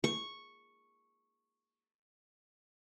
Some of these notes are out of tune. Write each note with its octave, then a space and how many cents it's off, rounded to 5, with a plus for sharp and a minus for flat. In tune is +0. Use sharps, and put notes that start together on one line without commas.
C#6 -5